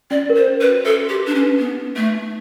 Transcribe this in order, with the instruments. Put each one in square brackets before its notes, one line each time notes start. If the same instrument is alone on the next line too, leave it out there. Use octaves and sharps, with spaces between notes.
[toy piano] C#4 [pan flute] D5
[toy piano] A#4
[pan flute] C5
[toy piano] C#4
[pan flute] B4
[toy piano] F#4
[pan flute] A4 [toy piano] E5
[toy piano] C6
[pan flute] G4
[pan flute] D4 [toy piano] B4
[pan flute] C#4
[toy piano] B4
[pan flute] B3 [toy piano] D#4
[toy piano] D#4
[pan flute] A3 [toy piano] E5
[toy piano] D#4